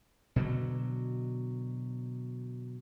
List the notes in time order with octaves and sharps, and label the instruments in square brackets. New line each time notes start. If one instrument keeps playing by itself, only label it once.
[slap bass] B2 D3 F#3